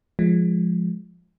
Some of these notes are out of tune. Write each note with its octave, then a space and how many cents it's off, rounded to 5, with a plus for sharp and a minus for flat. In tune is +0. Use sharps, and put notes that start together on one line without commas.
F3 +0 G#3 +0